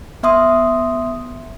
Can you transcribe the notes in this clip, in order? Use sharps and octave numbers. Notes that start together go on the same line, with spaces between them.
B3 E5 C6 D#6